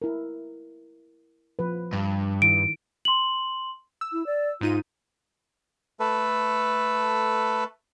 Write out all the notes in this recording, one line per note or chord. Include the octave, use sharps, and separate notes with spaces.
E4 A#4
F3 B4
G2
D#3 E4 D7
C6 F#7
E6
E4
D5
G#2 D#4 F4 D#7
A3 A4 B4